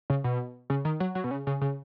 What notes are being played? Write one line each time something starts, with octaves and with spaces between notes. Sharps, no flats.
C#3
B2
C#3
D#3
F#3
F#3
B2
C#3
C#3
C#3